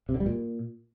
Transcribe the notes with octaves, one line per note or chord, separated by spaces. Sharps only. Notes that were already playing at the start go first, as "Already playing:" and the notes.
C3
D3
G3
A#2